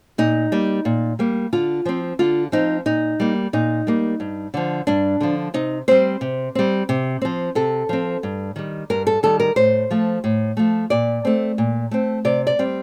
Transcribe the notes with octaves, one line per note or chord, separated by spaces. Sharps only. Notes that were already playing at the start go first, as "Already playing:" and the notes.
A#2 D#4
G3 A#3
A#2
G3 A#3
D3 F4
F3 C4
D3 F4
F3 C4 D#4
A#2 D#4
G3 A#3
A#2 D#4
G3 A#3
G2
D3 F3
G2 D4
D3 F3
C3 D#4
G3 C4 C5
C3
G3 C4
C3
F3 C4
C3 A4
F3 C4
G2
D#3 G3
G2 A#4
A4
D#3 G3 A4
A#4
A2 C5
F3 A3
A2
F3 A3
A#2 D5
A3 C4
A#2
A3 C4
C3 D5
D5
G3 C4